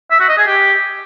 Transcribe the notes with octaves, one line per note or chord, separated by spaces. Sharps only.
E5
F#4
D#5
G#4
G4